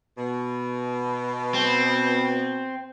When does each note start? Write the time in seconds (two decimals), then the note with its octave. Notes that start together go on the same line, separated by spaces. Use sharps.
0.17 B2
1.54 C4